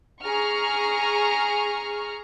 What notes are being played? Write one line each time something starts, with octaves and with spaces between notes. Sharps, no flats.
G#4 A#5 C#6 F6